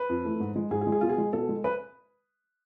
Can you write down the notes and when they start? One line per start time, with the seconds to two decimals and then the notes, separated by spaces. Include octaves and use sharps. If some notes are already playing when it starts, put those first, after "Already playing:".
Already playing: B4
0.09 F2
0.25 E3 A3
0.40 G#2
0.56 G#3
0.71 G#2 G#4
0.81 G#4
0.87 G#3
0.92 G#4
1.01 B2 F4
1.09 G#4
1.18 G#3
1.33 B2 A4
1.49 G#3
1.64 B4